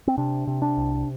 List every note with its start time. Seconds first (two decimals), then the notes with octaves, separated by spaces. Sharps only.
0.07 C4
0.18 C3 D4
0.47 C3
0.62 D4
0.77 C2